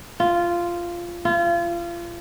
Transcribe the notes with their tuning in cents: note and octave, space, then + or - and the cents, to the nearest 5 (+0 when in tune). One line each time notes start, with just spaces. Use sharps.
F4 -10
F4 -30